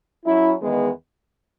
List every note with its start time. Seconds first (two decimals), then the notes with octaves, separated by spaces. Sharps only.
0.25 F#3 C#4 E4
0.60 E2 D#3 G#3 B3